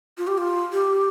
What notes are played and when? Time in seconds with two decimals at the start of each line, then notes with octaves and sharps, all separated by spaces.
0.18 F4
0.27 G4
0.38 F4
0.72 G4